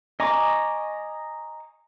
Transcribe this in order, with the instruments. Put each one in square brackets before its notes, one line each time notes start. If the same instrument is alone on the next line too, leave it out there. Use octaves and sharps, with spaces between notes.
[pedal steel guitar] D#5 G#5 A#5 C#6 D6